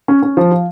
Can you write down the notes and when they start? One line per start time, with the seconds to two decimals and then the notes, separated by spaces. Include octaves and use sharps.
0.08 C#4
0.22 C#4
0.37 F3
0.52 F4